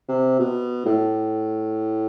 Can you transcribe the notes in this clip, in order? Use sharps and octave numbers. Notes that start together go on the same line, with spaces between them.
C3
B2
A2